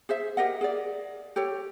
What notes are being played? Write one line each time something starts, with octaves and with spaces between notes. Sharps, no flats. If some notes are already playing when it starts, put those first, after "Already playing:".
G#4 C5 E5
G4 A#4 D#5 F#5
G#4 A#4 D5
G4 A4 C#5